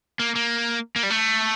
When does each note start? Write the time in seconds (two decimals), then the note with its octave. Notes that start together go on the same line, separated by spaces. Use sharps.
0.19 A#3
0.35 A#3
0.96 A#3
1.03 G3
1.10 A3